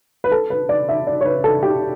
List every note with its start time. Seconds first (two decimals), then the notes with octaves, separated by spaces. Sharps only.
0.24 B4
0.32 A4
0.50 B4
0.69 D5
0.89 E5
1.07 D5
1.21 C#5
1.25 B4
1.44 A4
1.63 G4